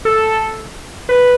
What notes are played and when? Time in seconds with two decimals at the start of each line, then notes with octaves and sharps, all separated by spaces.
0.05 A4
1.09 B4